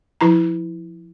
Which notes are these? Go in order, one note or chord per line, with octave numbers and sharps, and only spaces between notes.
F3 E4 A#5